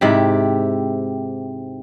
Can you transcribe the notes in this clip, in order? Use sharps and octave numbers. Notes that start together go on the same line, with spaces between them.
G#2 C3 E4 G4